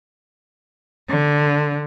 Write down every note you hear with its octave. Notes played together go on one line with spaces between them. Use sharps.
D3